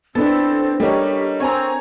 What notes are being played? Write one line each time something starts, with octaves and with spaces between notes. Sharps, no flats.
B3 C4 D4 E4 A4
G3 D#4 G4 A4 A#4 C#5
C4 C#5 G#5 A#5